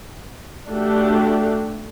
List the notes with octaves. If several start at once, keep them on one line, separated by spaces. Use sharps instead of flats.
A3 D4 F#4 G4